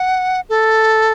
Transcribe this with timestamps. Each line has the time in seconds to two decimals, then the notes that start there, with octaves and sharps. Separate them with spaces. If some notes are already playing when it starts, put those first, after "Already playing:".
Already playing: F#5
0.49 A4